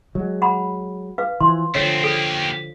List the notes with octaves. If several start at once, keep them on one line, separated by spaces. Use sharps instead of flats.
F#3 G#3
F#5 A#5 B5
B4 F5
E3 F3 C6
D3 F3 A3 C4 C#5
A#3 G4 A4